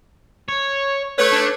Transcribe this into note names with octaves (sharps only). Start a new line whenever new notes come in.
C#5
A3 B4 C#5
D4